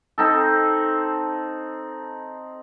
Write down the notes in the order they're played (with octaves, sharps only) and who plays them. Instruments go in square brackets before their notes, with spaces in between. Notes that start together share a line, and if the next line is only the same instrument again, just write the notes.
[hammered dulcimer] C4 D#4 A4